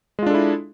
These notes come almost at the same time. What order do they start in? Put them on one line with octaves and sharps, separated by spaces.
G#3 F4 D4 A4 E4